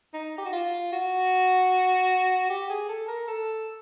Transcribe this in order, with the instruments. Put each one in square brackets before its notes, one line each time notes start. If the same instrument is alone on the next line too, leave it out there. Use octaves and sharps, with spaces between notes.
[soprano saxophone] D#4
G4
F#4
F4
F#4
G4
G#4
A4
A#4
A4